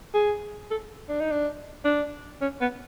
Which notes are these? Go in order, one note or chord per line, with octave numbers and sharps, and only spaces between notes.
G#4
A4
D4
D#4
D4
D4
C#4
B3